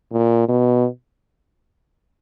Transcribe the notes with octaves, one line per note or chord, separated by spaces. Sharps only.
A#2
B2